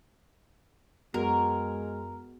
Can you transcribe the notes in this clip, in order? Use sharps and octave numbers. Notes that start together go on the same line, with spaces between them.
F#2 G#3 B3 F#4 A#4